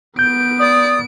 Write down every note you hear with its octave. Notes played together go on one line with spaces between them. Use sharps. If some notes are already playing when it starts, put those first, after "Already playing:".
B3 G6 D7
D5 D#6